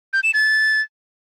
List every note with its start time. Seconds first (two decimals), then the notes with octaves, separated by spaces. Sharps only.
0.13 G6
0.24 E7
0.34 A6